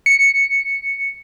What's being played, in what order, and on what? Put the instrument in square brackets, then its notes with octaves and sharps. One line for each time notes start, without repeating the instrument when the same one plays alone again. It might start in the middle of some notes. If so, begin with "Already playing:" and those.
[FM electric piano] C#7